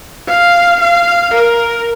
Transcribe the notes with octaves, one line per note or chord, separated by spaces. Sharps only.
F5
F5
A#4